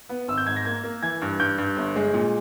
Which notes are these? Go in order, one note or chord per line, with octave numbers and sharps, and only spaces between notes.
B3
G#1 E6
G6
G#2 G#6
A#6
A#3 G#6
A#3
E3 G#6
G2
G2 G6
G2
G1
G#3
A#2